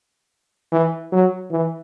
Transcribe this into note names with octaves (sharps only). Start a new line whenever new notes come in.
E3
F#3
E3